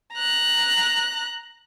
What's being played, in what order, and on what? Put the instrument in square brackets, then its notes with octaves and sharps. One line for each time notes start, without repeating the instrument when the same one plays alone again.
[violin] A#5 F#6